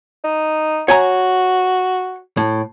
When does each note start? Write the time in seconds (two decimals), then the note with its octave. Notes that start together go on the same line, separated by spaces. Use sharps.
0.24 D#4
0.88 F#4 C#5 G#5 A#5
2.37 A2